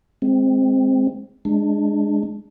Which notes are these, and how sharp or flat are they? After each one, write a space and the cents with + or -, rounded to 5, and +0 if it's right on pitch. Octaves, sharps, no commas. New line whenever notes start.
G#3 -5 C4 +0
G#3 +0 D4 +10